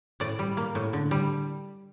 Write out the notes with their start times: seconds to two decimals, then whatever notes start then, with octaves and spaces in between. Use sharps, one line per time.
0.20 A2 D5
0.39 G3
0.57 A#3
0.75 A2
0.93 D3
1.11 G3